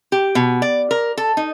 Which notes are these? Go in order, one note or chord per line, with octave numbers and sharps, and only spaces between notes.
G4
B2
D5
A#4
A4
D#4